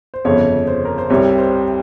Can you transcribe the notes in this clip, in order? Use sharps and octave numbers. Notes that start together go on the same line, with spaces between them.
C5
G1 F2 C#3 C#5
C5
A#4
C5
C2 C3 G3 C#5
C5